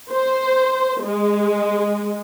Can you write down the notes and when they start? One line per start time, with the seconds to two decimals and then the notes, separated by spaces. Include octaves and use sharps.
0.12 C5
1.03 G#3